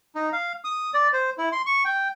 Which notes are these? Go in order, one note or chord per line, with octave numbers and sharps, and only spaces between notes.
D#4
F5
D#6
D5
C5
E4
C6
C#6
G5